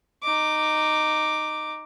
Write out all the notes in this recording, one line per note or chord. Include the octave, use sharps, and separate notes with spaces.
D#4 D6